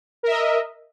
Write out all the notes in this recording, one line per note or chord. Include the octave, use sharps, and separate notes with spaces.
A#4 D#5 E5